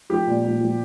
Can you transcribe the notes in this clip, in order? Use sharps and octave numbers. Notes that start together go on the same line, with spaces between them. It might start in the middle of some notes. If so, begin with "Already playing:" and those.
F3 G4
A#2
A#2
F3